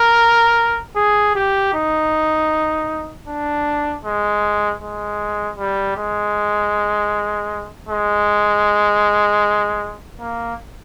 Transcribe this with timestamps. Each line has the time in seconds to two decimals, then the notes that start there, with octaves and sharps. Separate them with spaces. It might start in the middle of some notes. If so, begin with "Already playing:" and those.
Already playing: A#4
0.96 G#4
1.35 G4
1.74 D#4
3.27 D4
4.05 G#3
4.82 G#3
5.58 G3
5.97 G#3
7.89 G#3
10.20 A#3